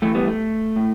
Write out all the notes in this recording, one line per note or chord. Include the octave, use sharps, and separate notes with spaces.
A2 E3 A3
G3 B3
A3
A2